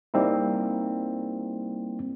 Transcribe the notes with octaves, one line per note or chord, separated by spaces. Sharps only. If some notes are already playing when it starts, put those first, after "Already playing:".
G3 A#3 C4 D#4 E4